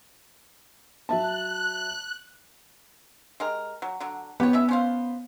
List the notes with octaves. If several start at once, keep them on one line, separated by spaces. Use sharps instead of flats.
F#3 E5 A5 F#6
G#3 G4 A#4
F#3
D3 F#3
B3 G4 C#5
G3 C#4 E5
C#4 C5 F5